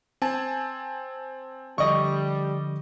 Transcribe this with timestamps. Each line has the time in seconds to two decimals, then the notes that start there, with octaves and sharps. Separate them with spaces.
0.22 C4 G#5 A5
1.78 D3 F3 G3 D#5 C#6